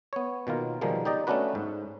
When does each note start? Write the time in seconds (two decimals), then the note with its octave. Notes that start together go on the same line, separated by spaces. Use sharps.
0.13 B3 C#5
0.47 B2 D#3 A#3 F4
0.81 B2 D#3 F3 G3 G#3 A#3
1.05 D#4 G4 D5 D#5
1.27 A3 B3 C#4 D4 F#4 B4
1.55 G#2